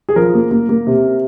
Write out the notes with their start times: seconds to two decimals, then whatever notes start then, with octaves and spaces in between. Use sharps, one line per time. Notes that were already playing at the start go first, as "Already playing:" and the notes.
0.09 G#4
0.16 F3 A#4
0.34 A#3
0.51 A#3
0.69 A#3
0.87 C3